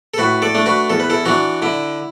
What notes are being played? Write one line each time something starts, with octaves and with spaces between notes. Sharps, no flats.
A4
A2 F#4 B4
A4 D5
A3 D4
F#4 B4
E2 A4
B4
E4 A4
E3 D4 F#4
D3 E4